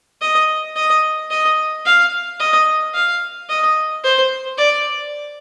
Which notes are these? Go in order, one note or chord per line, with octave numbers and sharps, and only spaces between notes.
D#5
D#5
D#5
F5
D#5
F5
D#5
C5
D5